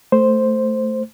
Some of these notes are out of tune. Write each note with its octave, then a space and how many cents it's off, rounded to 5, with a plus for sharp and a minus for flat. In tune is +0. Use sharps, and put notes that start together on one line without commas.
A3 +5 C5 +0